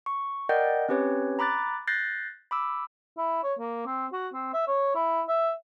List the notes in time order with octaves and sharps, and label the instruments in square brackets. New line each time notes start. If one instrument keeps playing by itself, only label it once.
[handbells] C#6
A#4 D5 D#5 F#5 G5 G6
C4 C#4 G4 B4 C#5
A#5 B5 D6 F#6 A6
F#6 G6 A6 A#6 C7
B5 D6 E6
[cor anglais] E4
C#5
A#3
C4
F#4
C4
E5
C#5
E4
E5